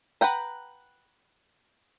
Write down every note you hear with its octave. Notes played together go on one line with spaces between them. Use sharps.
B4 F#5 G5 A#5